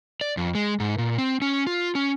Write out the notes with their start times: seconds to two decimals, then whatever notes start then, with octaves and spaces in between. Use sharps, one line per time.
0.21 D5
0.37 F2
0.55 G#3
0.80 G#2
0.98 A#2
1.18 C4
1.42 C#4
1.67 F4
1.95 C#4